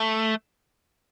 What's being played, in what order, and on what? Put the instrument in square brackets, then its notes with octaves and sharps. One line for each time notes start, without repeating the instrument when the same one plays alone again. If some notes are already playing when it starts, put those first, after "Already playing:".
Already playing: [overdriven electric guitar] A3